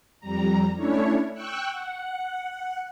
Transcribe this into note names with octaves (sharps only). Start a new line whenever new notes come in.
F2 G3 A#5
A3 C#4 D4 E4 C#5
G5 C#6 E6 F#6
F#5